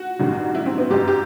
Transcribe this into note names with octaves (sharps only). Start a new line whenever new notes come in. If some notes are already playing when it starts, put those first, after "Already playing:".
Already playing: F#4
A1 G2 D#3 F#3
E4
C4
B3
G1 F#2 F#3 G4
G4